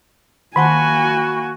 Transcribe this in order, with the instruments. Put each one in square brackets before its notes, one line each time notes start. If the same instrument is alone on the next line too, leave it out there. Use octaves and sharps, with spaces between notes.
[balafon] D#3 F#5 A5 [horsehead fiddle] A#3 G#5 [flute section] F#4 [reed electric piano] B5